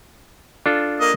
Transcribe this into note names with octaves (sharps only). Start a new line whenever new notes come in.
D4 F4 A4
A#3 D#5